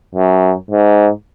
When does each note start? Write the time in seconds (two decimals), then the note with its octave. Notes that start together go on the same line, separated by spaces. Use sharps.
0.15 F#2
0.71 G#2